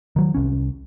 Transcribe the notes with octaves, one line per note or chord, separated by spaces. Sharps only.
D#3 F#3
C2 C#4